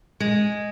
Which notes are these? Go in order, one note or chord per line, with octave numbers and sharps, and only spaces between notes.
G#3